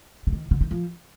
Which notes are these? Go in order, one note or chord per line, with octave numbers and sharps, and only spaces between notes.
D3
D#3
D3
D#3
F3